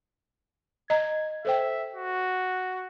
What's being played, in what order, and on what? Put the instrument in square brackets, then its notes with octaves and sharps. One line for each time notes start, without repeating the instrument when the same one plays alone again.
[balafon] D#5 A#5 [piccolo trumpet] G#6
[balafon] A4 C5 G5 [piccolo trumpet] E5
[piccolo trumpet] F#4